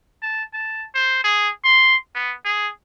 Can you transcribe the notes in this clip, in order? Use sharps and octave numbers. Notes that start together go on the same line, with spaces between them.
A5
A5
C5
G#4
C6
B3
G#4